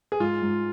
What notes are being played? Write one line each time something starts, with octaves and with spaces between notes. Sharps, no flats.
G#4
G#2 F4
G#2